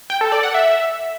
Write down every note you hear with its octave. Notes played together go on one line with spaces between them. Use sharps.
G5
A4
D5
F#5
E5